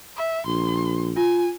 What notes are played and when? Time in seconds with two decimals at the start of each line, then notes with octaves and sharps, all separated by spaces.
0.17 E5
0.46 A#1 C6
1.16 F4 G#5